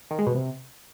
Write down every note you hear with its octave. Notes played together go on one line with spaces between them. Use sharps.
D#3
G#3
B2
C3